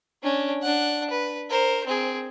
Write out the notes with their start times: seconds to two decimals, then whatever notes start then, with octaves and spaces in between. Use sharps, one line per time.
0.23 C#4 D4
0.62 D4 F#5
1.10 B4
1.50 A#4 C5
1.87 C4 G#4